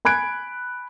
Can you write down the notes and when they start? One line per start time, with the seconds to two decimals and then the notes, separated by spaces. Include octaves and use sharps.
0.05 G#5 B5 F#6 G#6 D7